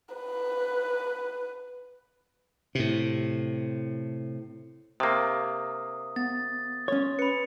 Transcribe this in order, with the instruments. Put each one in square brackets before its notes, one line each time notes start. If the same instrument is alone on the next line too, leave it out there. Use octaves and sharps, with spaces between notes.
[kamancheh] B4
[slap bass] A2 C3
[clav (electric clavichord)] C3 A#3 [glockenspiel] D#6
[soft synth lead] B3 [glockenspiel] A6
[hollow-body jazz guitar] C#4 C#5 [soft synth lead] C6
[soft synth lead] B4 [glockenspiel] B5 C#7